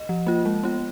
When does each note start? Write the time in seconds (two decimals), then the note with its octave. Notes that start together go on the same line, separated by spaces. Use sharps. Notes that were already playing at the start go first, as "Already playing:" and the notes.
Already playing: D#5
0.09 F3
0.27 A#3 F4
0.45 G#3
0.63 B3 F4